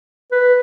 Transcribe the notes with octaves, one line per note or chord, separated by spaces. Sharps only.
B4